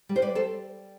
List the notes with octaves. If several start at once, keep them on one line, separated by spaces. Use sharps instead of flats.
G3
C5
B4 D5
G3 A4 C5